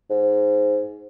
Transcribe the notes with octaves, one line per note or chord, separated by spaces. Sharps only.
G#2